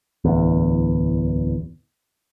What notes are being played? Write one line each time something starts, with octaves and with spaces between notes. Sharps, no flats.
D1 E2